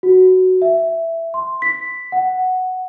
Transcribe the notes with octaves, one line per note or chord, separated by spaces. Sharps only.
F#4
E5
C6
B6
F#5